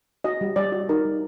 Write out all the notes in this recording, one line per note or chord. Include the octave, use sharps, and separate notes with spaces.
F#4 D#5
G3
G3 D5
F#4
D#4 A#4
G3